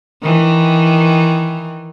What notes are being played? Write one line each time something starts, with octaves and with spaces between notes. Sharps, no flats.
D#3 E3